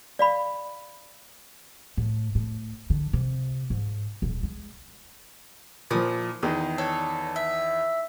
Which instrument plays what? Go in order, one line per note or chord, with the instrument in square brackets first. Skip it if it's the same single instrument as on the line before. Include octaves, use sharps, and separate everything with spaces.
[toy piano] D5 F5 B5
[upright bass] A2
A2
D3
C3
G#2
D#1
G#3
[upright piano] A#2 F3 [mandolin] E4 D6 D#6
[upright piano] E2 D#3 [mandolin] D#5
[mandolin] D4 A4 C#5
E5